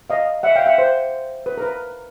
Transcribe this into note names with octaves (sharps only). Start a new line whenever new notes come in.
D#5 F5
E5 F#5
F5 G5
E5 F#5
C5
B4
A#4
B4